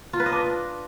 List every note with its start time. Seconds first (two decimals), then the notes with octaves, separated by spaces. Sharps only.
0.13 F4
0.20 B4
0.26 D#5
0.32 D4